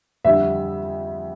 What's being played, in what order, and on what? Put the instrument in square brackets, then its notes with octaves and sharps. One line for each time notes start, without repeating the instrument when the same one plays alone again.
[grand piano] F2 D3 G3 E5